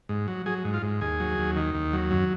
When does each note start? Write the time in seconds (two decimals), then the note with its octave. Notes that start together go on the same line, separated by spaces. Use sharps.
0.09 G#2
0.28 F#3
0.46 F#3 G#4
0.65 G#2
0.74 F4
0.83 G#2
1.01 D#2 G#4
1.20 F#3
1.38 D#2
1.56 D#3
1.74 D#2
1.93 F#3
2.11 F#2